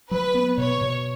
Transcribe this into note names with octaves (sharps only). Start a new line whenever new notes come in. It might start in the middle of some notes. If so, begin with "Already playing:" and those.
F#3 B4
B3
B2 C#5
B2